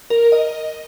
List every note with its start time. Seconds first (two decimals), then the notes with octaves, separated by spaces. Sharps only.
0.10 A#4
0.32 D#5